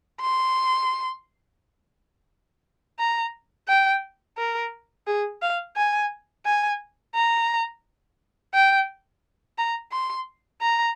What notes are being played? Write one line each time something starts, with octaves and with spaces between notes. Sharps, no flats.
C6
A#5
G5
A#4
G#4
F5
G#5
G#5
A#5
G5
A#5
C6
A#5